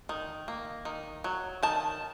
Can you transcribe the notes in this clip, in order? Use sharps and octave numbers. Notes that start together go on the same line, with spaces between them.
D#3
A#3
D#3
F#3
D#3 A5